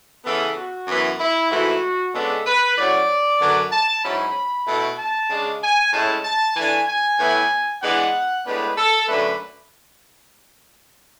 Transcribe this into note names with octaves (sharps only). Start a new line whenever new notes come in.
C#3 E3 B3 A4
F#4
F#2 E3 B3 E4
E4
G#2 E3 A3 E4 F#4
C#3 G#3 B3 D4 A4
B4
A2 F#3 C#4 D5
F#2 D3 F#3 B3
A5
G#2 F#3 C#4 E4 B5
B2 A3 E4
A5
C#3 G#3 D4
G#5
A2 G#3 C#4 E4 A5
A5
E3 A3 D4 G#5
G#5
A2 E3 B3 E4
E3 G#3 B3 D4 F#5
A2 G#3 B3 D4 B4
A4
F#2 D3 A3 D4 B4